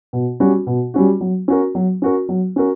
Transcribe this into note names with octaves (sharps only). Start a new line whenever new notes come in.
B2
G3 C#4 F#4
B2
G3 C#4 F#4
F#3
C#4 F#4 A#4
F#3
C#4 F#4 A#4
F#3
C#4 F#4 A#4